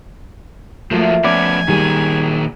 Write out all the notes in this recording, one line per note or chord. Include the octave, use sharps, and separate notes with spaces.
F3 F#3 A3 A#3 F4
F3 B3 C#4 D5 G#5
A#2 D#3 G3 G#4